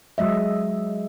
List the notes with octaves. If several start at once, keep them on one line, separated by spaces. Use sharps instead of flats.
F#3 G#3 D#5 E5